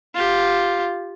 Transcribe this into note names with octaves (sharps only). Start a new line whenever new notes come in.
F4 G4